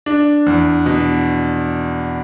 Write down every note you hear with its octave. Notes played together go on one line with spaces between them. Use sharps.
D4
E2
B2